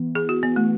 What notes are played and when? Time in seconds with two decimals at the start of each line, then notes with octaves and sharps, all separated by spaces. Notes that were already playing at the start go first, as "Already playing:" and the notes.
Already playing: E3 B3
0.15 E3 G#4
0.29 F#4
0.43 B3 F#4
0.56 A3